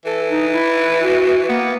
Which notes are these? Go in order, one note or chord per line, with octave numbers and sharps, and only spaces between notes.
E3 A4
D#4
E4
F#4
A#3 B3